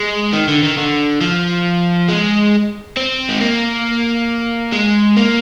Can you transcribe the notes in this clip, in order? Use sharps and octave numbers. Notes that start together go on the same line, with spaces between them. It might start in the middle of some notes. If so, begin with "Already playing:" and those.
Already playing: G#3
D#3
D3
D#3
D3
F3
G#3
C4
G#3
A#3
G#3
A#3